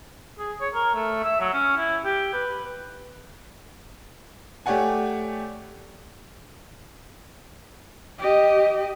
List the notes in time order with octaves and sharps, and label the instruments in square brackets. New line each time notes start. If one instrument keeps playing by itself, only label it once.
[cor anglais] G#4
C#5
A#4
A3
E5
F#3
C#4
E4
G4
B4
[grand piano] A3 G4 C#5 D5 F#5 G#5
[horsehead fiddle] G4 D#5